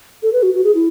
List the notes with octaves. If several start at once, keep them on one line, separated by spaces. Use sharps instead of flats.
A4
B4
F#4
F#4
G#4
E4